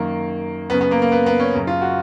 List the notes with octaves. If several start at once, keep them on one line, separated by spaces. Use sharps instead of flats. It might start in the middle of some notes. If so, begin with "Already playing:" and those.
Already playing: F#2 D#3 A#3
F#2 C#3 B3
B3
A#3
A#3
B3
B3
C#4
F#2 C#3
F4
F#4